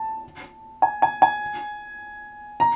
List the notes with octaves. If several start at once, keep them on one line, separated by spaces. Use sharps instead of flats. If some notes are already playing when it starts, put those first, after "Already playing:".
Already playing: A5
G#5
G#5
G#5
A#5